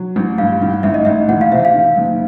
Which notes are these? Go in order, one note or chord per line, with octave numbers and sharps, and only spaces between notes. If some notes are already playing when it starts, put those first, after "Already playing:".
Already playing: F#3
A1
G2 F5
D#3
A1 E5
D#5
A1 E5
E2 F#5
F5
C3 E5
F5
D#3
F#1